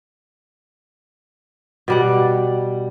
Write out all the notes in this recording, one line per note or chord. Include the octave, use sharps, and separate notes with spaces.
B2 G3 F#5